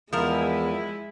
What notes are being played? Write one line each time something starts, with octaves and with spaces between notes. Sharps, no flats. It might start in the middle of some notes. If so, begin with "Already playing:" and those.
E2 F3 G#3 E4 A#4